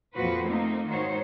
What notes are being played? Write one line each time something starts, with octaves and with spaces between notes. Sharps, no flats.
F2 A#2 F3 F#4 B4 C5
A3 A#3 C4 D#4
G#2 D#3 F#4 C5 C#5